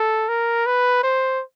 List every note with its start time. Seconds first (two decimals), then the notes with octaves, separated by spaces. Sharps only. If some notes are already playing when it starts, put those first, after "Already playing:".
Already playing: A4
0.29 A#4
0.66 B4
1.03 C5